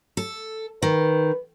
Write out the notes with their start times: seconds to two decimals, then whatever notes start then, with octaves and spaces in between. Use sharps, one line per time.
0.17 A4
0.82 D#3 B4